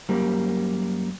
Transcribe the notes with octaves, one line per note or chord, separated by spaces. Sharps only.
F#2 G3 A#3